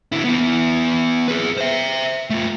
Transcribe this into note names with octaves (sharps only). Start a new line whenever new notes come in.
D3 E4
B3 E4
G#4 B4
C5 E5
A3 F4